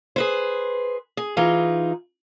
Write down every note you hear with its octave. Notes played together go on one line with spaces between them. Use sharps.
G#4 B4 C5
G#4
E3 D#4 F4 G#4